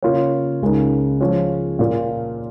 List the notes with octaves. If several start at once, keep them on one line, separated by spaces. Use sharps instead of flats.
C#3 A#3 F4 A#4 C#5
C#2 C#3 G#3 D#4 A#4
F3 G#3 C#4 F4 C#5
A#2 A#3 F4